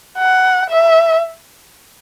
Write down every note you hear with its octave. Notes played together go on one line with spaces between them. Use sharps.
F#5
E5